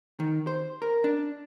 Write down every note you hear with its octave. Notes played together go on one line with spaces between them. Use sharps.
D#3
C5
A#4
D4